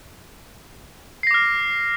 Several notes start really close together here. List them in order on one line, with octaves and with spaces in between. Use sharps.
C7 A#6 D6 F6